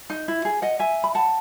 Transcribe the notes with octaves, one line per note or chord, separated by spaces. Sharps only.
D#4
E4
G#4
D#5 F#5
E5 G#5
B5
F#5 A5